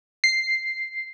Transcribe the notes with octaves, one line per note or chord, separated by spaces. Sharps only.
C7